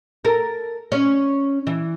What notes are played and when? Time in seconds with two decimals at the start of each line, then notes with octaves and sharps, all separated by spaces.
0.25 A4 A#4
0.92 C#4
1.67 E3